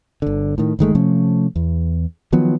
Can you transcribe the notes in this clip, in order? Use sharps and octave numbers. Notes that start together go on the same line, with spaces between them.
G1 D3
A2 D#3
G1 D#3 G#3 A3
C3 F3 A3 C#4
E2
D#3 F3 F#3 B3